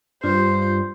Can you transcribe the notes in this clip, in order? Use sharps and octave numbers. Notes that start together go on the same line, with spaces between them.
G2 F4 C5